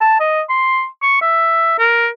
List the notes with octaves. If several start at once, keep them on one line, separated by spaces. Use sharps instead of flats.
A5
D#5
C6
C#6
E5
A#4